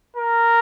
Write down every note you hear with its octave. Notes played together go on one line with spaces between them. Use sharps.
A#4